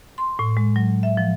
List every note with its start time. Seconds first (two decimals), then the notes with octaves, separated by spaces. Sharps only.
0.18 C6
0.39 A2
0.57 G#3
0.76 F#3
1.03 E5
1.17 F3